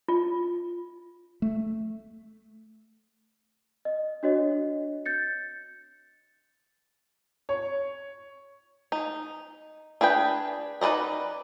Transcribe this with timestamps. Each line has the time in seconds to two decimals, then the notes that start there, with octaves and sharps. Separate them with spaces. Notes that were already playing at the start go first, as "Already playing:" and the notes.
0.08 F4
1.42 A3
3.85 D#5
4.23 D4 F#4 C#5 D#5
5.06 G6 A6 C#7
7.49 C#5
8.92 D#4
10.01 D4 G#4 B4 G5
10.81 D#4 B4 C5 D5 D#5